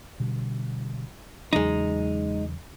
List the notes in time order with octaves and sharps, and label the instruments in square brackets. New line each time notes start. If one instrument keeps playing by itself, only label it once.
[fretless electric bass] B2 D3 G3
[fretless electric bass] E2 C#3 F#3 [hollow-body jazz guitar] G#3 D#4